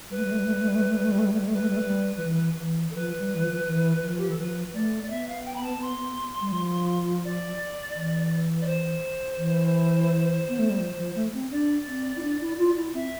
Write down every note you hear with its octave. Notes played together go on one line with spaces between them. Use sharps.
G3 B4
A3
G3
A3
G3
A3
G3
A3
G3
A3
G3
A3
G3
A3
G3
A3
G3
A3
G3
A3
G3 B4
A3
G3
A3
G3
F3
E3
E3
A4
F3 B4
G3
E3
F3
E3
F3
G4
E3 A4
F3 B4
A3 D5
D5
B3 E5
F5
G5
B5
A5
C6
G3
F3
D5
E3
D5
C5
E3
B3
A3
G3
F3
F3
A3
C4
D4 D5
C4
E4
D4
E4
F4
E4
C4 E5